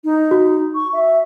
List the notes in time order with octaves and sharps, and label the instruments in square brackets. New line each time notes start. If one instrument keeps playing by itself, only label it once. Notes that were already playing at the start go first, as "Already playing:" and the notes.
[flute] D#4
[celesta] F#4
[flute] C#6
E5